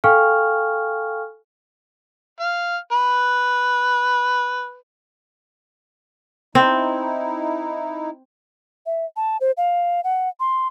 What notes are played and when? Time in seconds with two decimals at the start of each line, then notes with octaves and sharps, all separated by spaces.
0.04 A4 F5 G5 G#5 C#6 F6
2.40 F5
2.92 B4
6.55 C4 D#4 E4
8.86 E5
9.16 A5
9.41 C5
9.57 F5
10.04 F#5
10.40 C6